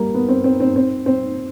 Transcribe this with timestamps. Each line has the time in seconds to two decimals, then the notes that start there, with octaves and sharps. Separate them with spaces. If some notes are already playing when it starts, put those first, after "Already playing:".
Already playing: G3 A#3
0.14 B3
0.29 C4
0.44 C4
0.60 C4
0.76 C4
1.06 C4